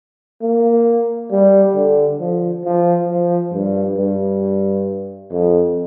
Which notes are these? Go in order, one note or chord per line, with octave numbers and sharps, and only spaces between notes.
A#3
G3
D3
F3
F3
F3
G2
G2
F2